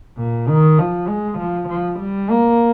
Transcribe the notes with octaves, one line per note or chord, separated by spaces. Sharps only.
A#2
D#3
F3
G#3
F3
F3
G3
A#3